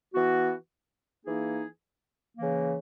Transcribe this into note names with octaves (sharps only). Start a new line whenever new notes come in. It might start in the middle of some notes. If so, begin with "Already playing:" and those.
E3 B3 F#4
E3 A#3 D#4 G#4
C#3 E3 A#3